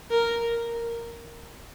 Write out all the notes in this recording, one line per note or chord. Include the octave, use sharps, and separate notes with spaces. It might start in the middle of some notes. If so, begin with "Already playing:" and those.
A#4